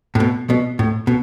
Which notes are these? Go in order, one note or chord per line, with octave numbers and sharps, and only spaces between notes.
A2
B2
B2
A2
B2